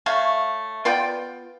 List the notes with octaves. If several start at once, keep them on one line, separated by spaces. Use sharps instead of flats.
A3 C#5 F5
B3 F4 D5 G5